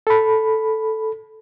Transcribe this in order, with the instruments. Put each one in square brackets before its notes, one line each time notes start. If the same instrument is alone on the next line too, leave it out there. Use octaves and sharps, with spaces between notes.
[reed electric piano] A4 B5